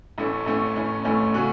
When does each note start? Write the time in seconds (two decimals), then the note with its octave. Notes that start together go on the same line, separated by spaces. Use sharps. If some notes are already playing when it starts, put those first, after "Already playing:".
0.18 A1 A2 A3 C#4
0.46 A1 A2 A3 C#4
0.76 A1 A2 A3 C#4
1.04 A1 A2 A3 C#4
1.34 C#3 A3 C#4 F#4